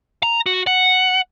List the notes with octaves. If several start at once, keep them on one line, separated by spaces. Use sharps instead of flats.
A#5
F#4
F#5